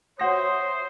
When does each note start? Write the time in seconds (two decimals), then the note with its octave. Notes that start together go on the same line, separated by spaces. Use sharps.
0.19 F#4 C5 C#5 E5 F#5 D#6 A#6